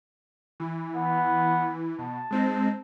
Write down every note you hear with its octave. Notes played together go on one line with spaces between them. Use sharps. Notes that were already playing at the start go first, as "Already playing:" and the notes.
E3
B3
B2 A5
G#3 C4 D#4